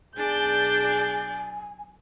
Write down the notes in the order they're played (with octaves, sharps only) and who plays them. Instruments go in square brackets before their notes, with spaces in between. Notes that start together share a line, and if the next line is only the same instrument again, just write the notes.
[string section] B1 G6 [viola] D4 D5 [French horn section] G#4 [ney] G#5